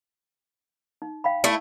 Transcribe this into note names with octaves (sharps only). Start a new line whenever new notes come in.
D#4
F5 G5 B5
A3 E4